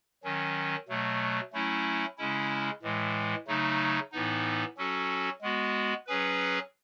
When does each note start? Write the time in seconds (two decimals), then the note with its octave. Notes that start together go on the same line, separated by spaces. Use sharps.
0.24 D#3 F#3 C#4
0.89 B2 F#3 A3
1.53 F#3 A3 C#4 E4
2.18 C#3 G#3 C#4 E4
2.83 A2 E3 G#3
3.47 C#3 F#3 A3 D#4
4.12 A2 E3 B3 D#4
4.78 F#3 C#4 F#4 A4
5.42 G#3 B3 F#4
6.07 F#3 C#4 G#4 B4